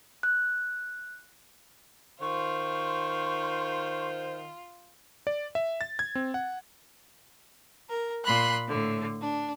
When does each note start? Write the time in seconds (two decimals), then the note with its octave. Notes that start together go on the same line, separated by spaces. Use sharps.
0.23 F#6
2.21 D#3 F4 C5 C#6
5.27 D5
5.55 E5
5.81 A6
5.99 G#6
6.15 C4
6.34 F#5
7.88 A#4
8.24 A#2 B5 C6 F#6
8.69 A2 D3
9.19 D4